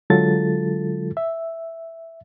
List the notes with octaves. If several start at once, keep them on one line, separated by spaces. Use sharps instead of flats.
D3 F#3 G#3 F4 A4 A6
E5